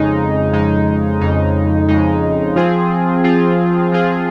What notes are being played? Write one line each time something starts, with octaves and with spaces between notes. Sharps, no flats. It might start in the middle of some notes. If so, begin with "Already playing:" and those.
Already playing: F2 C#3 G#3 D#4
F2 C#3 G#3 D#4
F2 C#3 G#3 D#4
F2 C#3 G#3 D#4
F3 C4 F4 G#4
F3 C4 F4 G#4
F3 C4 F4 G#4